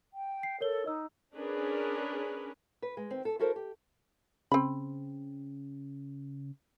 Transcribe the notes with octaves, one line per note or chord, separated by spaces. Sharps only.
G5
C7
A4 A#4 C#5 G7
D#4 D#5 E6
C#4 D4 G#4 A#4 B4
B4
G#3
D#3 C4
A4
E4 F#4 A4 A#4 C5
G4
C#3 C4 B5